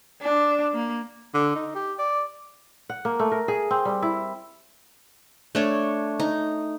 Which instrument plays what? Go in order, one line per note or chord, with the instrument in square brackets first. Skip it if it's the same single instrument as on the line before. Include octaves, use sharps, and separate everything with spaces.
[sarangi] D4
A#3
[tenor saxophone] D3
D#4
G4
D5
[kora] F#5
A#3
A3
A#4
G#4
C4
G3
E4
[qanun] A3 D4 C#5
D#4